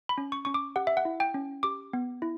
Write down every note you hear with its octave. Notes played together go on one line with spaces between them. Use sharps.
B5
C#4
C#6
C#4 C#6
D6
G4 F#5
E5
F#5
E4
G5
C#4
G4 D6
B3
E4